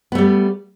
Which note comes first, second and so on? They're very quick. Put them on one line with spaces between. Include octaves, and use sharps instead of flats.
B3 A3 G3